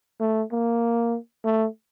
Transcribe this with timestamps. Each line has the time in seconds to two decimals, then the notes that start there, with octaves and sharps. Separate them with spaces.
0.20 A3
0.52 A#3
1.45 A3